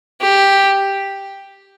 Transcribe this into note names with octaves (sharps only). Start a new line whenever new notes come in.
G4